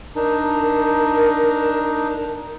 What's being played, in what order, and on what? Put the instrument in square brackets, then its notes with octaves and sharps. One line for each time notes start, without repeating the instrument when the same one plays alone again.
[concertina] D4 D#4 [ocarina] A#4